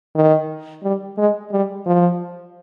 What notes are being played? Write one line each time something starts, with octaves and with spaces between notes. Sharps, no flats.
D#3
G3
G#3
G3
F3